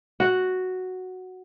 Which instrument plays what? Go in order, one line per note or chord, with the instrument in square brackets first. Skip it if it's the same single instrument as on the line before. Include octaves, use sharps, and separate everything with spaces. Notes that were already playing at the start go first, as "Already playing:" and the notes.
[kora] F#4